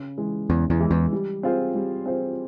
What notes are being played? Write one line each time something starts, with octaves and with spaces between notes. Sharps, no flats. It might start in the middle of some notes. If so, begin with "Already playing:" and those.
Already playing: C#3
E3 G#3
E2 C#3
E2
E3 G#3
E2
G3
C4 F4 G#4 C5
G3
C4 F4 G#4 C5